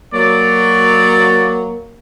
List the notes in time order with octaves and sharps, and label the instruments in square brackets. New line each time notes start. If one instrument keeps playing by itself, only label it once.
[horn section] F#3 [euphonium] A#3 [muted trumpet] D5